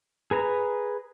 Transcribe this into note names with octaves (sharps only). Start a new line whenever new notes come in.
G#4 B4 A#5